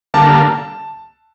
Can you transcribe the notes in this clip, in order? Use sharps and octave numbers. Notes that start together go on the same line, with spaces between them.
D3 G3 A#3 A5